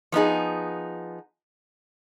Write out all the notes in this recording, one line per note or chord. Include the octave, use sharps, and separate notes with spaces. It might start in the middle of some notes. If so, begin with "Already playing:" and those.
F3 B3 D#4 G#4